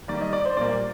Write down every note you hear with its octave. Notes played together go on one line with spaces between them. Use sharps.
D#3 G3 A#3 D5
D#5
D5
C5
A#2 G3 A#3 D5